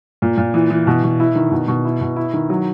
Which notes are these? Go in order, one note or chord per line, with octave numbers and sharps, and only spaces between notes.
A#2
A#2
E3
E3
B2
B2
E4
D#3
B2
B2
E4
B2
E4
D#3
F#3